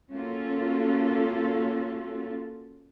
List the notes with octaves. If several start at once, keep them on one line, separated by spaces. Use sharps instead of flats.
A#3 C#4 F4 F#4 A4